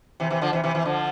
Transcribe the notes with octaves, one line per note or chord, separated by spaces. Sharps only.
C3 E3
C3 E3
D3 F3
C3 E3
C3 E3
C3 E3
D3 F3